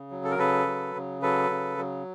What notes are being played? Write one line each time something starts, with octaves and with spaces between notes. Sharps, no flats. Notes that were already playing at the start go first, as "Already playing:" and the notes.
Already playing: C#3
F#3
A4
A#4
C#3 A4 B4
F#3
C#3
F#3 A4 B4
C#3
F#3